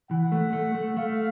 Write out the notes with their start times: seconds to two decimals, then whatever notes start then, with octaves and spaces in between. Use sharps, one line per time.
0.10 E3 F#5
0.32 A3
0.53 A3
0.75 A3
0.96 A3 F5